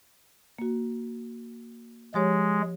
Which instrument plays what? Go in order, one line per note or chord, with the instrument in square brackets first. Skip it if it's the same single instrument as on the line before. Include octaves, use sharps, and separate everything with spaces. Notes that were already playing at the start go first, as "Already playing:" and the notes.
[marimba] A#3 F#4
[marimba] F3 G4 C#5 [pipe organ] G#3